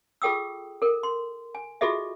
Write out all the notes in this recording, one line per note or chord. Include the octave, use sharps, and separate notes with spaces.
F4 G#4 A4 G5 D#6 E6
A4 A#4
C6
G#5
F4 F#4 G#4 A4 D#5 E5